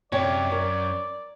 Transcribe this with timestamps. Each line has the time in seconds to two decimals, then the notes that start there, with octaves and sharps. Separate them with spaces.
0.12 F#2 C3 C#5 D5
0.52 A#4